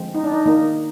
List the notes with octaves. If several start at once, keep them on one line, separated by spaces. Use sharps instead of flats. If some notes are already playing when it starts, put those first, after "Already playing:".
Already playing: D3 F3 G#3 C4
D#4
D4
D#4
D#3 A#3 D#4